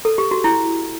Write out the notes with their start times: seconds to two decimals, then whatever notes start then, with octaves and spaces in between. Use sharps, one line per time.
0.05 A4
0.18 G4
0.31 F#4
0.44 E4